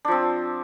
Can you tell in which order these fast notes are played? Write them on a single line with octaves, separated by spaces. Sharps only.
D4 F3 C4